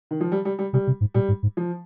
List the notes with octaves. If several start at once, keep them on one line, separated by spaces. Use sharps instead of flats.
D#3
F3
G3
G3
G3
C3 G3
C3
G#2
A#2 G3
G#2
G#2
F3